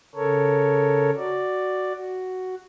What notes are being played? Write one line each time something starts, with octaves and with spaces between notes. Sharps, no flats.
C#3 A4 A#4 C#5
F#4 D5
F#4